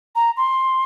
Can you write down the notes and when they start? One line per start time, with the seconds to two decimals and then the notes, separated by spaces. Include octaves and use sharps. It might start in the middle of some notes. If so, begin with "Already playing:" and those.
0.16 A#5
0.37 C6